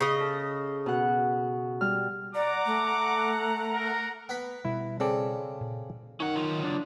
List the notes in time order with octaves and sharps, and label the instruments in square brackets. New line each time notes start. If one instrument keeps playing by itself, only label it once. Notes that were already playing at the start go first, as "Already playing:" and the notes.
[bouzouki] C#3 D#5
[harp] A4
B2 F#5
G3 F6
[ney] D5 [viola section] F#5 A#5 [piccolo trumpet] D6
[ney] A3
[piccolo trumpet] A#4
[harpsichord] B3 B5
[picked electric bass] B2 G3 [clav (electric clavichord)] E4
[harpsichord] C#3 [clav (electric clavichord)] C4 A4 D5
[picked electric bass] A#2
[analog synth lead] D#3 [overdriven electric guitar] C#4 F#5
[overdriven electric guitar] F#3 F4
[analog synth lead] D4